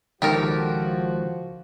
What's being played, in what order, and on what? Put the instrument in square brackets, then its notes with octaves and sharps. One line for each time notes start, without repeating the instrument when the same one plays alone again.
[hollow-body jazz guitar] C#2 D#3 [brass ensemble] F3 F#4 [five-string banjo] G4 A4 A#4